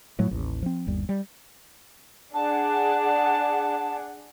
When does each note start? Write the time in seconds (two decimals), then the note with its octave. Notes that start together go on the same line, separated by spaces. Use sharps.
0.19 A2 F#3 A3
0.31 A1 D#2
0.63 F3 C4
0.87 G1 D#2 G3
1.09 G3
2.34 D4 G#4 F#5 A5